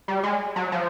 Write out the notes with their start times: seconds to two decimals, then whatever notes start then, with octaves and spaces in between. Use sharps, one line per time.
0.08 G3
0.23 G#3
0.56 F#3
0.72 F3